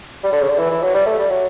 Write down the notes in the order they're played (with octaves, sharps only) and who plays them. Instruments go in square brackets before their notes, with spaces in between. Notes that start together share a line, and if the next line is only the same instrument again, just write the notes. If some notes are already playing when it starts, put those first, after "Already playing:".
[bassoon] G3
D3
C#3
D3
E3
E3
F#3
G3
A3
G3
F#3